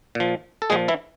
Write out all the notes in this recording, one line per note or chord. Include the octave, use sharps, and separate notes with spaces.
A#2 F3
A4
A#2 F3 G#3 G#4
E3 E4